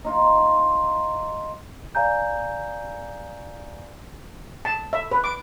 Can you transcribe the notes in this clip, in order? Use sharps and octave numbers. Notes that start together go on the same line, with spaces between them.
D#4 F4
D5 F5 G#5 A#5 G6
A5
E5
B4
D6